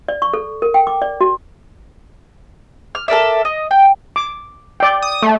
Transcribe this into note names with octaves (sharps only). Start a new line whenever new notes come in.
D5
C#6
A4
A#4
G5
D6
D5
F#4
F6
A4 A#4 D5 E5
D#5
G5
D6
D5 G5
D#6
A3